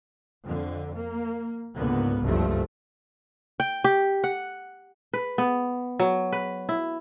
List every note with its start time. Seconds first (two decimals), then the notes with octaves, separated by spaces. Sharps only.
0.44 F2 D3
0.95 A#3
1.76 C#2 G#2 D3 A#3 B3
2.22 F#1 C#2 G2 F3 A3
3.60 G5
3.84 G4
4.24 F#5
5.13 B4
5.38 B3
5.99 F#3
6.32 B4
6.69 E4